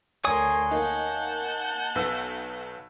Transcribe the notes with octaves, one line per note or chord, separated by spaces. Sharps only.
D2 A#4 C#5 G#5 C6 D#6
A#3 D#4 F#5 A5 G6
B1 B3 E6